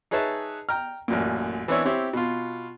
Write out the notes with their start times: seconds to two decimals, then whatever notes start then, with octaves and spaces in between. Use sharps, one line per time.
0.11 D#4 G#4 B4 C#5 E5 A5
0.69 G5 A#5 F6
1.08 A1 F#2 A#2
1.68 E3 B3 C4 D4 E4 C#5
1.85 C4 E4 G4 C#5
2.13 B2 F4